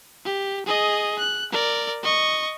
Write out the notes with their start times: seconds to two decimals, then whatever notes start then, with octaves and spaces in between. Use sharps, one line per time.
0.25 G4
0.66 G#4 D#5
1.18 F#6
1.52 A#4 D5
2.03 D#5 C#6